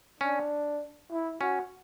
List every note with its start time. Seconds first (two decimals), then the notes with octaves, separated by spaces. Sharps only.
0.20 C#4 D4
1.12 E4
1.41 C#4 F#4